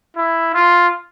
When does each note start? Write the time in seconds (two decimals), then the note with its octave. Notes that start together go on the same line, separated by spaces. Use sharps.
0.16 E4
0.54 F4